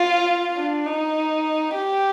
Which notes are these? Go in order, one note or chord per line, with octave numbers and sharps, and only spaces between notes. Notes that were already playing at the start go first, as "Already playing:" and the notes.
Already playing: F4
D4
D#4
G4